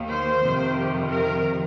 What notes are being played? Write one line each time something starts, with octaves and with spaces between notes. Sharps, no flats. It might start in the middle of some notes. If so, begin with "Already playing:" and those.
Already playing: D#2 D#3 A#3
C5
F2 C3 D#3
G4
A#4